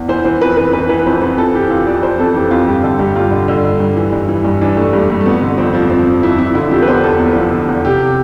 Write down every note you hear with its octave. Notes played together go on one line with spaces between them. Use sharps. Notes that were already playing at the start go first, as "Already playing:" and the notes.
Already playing: E2
E3 C5
E3 C5
F2 B4
E3 B4
E3 B4
E3 B4
F2 C5
E3 C5
F2 A4
E3 G4
E3 F4
F2 D5
F2 C5
F2 A4
E3 G4
F2 F4
G2 G4
D3 A4
G2 G4
G2 F4
D3
D3
G2
G2
E3
G2
E3
G2
E3 D4
G2 A3
G2 G3
G2 A3
A3
F2 B3
D3
F2 C4
F3
F3 C4
F2
F2 E4
F2 E4
D3 E4
F3 G4
B4
E2 C5
E2 A4
E2
F3
D3
E2
C3 G4